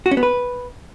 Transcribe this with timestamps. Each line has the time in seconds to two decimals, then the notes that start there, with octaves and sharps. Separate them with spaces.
0.06 F#4
0.11 C#4
0.17 B3
0.23 B4